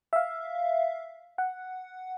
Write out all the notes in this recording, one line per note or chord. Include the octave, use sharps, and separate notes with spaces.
E5 F5
F#5